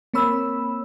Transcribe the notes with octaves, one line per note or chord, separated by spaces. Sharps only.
A#3 C4 C#5 B5 E6